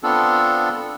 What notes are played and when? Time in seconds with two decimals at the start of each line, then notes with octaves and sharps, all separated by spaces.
0.03 B3 C4 D4 F4 A4